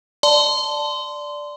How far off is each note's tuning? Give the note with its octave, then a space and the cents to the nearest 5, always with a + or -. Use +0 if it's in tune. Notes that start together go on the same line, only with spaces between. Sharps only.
D5 +0 A5 +5 C6 -15